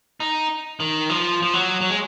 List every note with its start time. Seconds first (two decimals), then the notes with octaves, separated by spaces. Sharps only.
0.20 D#4
0.80 D#3
1.10 F3
1.42 F3
1.54 F#3
1.81 F#3
1.90 G#3